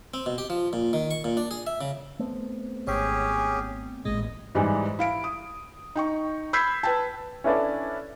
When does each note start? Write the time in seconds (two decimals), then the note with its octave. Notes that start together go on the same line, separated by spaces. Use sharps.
0.14 C4
0.26 B2
0.38 G4
0.50 F3
0.73 A#2
0.93 D#3
1.11 C#6
1.24 A#2
1.37 D4
1.51 G#4
1.67 E5
1.81 C#3
2.19 A3 B3 C4
2.87 G#1 C#4 G4 G#4 C#5 G5
4.05 A1 A#2 G#3 D#5
4.55 G#2 E3 G3 G#3
4.99 E4 F5 D7
5.24 D#6
5.95 D#4 G5 C#6
6.53 B5 E6 G6 G#6 B6 C7
6.83 B4 G5 A5
7.44 C#4 D4 E4 A4 B4 D5